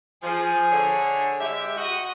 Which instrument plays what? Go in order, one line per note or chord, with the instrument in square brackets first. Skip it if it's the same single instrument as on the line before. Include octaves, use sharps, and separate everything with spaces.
[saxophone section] F3 [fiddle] G#4
[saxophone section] D3 C#5
G#3 G4 E5
[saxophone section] F#4 [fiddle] D#5 D#6